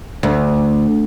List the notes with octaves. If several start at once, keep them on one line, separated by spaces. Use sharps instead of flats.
D2